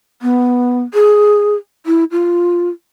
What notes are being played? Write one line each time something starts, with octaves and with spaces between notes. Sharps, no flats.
B3
G#4
E4
F4